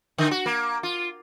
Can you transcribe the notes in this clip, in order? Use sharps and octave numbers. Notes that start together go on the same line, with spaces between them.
D3
F#4
A#3
F4